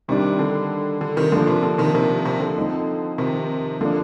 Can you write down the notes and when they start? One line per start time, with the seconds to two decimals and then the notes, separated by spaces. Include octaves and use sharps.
0.08 C3 D#3 G3 D4
0.39 D3
1.01 D3
1.17 C3 D#3
1.32 D3 F3 A#3 D4
1.47 C3
1.63 D3
1.78 C3 D#3
1.94 C3 D#3
2.25 C3
2.40 D3
2.56 F3 C4 D#4
3.18 C3 D#3
3.81 D3 F3 A#3 D4